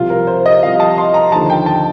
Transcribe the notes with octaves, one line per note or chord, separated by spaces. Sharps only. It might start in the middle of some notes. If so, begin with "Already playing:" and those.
Already playing: C2 C3 F3 F4
A#4
C5
D#5
C2 C3 F3 F5
A5
C6
A#5
D#2 D3 F3 A5
G5
A5